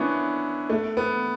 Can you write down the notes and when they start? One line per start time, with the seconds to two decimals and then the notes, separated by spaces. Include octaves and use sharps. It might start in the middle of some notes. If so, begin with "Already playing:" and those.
Already playing: B3 C#4 D4 E4
0.70 A3
0.97 B3